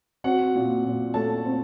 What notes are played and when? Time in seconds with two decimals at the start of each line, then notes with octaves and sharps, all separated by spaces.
0.24 C4 F#4 F#5
0.55 A#2
0.85 A#2
1.14 A3 A4 A5
1.45 C4